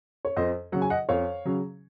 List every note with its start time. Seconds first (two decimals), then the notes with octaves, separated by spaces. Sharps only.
0.25 C#5
0.36 F2 C5 D#5
0.72 C#3 F#3 F#5
0.82 G#5
0.90 D#5 F#5
1.09 F2 C#5 F5
1.45 C#3 F#3